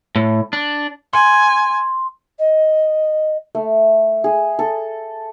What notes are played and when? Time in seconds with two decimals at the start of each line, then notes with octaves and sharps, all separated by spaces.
0.16 A2
0.53 D4
1.13 G#5 C6
2.38 D#5
3.55 A3
4.24 G#4
4.59 A4